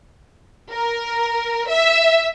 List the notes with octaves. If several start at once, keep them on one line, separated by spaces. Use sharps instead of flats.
A#4
E5